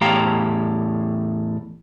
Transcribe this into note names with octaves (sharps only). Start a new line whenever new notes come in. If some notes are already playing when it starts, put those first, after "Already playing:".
E2 A2 G4 F5 G5 A#5